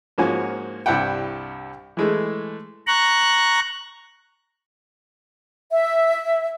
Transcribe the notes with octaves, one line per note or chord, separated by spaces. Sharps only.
G#2 F3 A#3 C#4 F#4 G#5
C2 G2 E4 G4 F#5 G5
E3 G#3 A3
A#5 C#6 F#6
E5